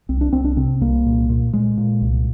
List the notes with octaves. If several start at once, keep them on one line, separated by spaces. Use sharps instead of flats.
C2 C4
D4
C2 C4
D4
C3 C4
C2 A#3
A#2
A#2
A#2 G#3
A#2
C2